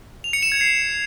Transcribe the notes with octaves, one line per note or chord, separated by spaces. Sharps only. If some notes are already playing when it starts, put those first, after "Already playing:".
F7
C#7
E7
G#6
C7